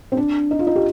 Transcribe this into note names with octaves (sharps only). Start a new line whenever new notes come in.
C4
D4
D#4
F4
D#4
G4